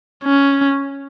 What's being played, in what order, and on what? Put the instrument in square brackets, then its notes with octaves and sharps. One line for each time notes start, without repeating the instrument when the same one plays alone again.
[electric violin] C#4